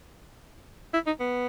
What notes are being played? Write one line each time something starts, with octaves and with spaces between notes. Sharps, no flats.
E4
D#4
B3